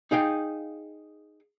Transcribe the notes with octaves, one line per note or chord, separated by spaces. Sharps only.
D#4 G#4 F5 G5